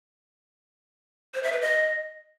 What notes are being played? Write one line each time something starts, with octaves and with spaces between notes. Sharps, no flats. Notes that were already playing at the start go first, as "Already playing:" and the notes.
C5
E5
B4
D#5